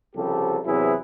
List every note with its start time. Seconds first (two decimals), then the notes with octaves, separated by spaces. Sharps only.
0.16 C2 C#3 F3 G4 A4
0.65 E2 C3 F#3 E4 G#4 B4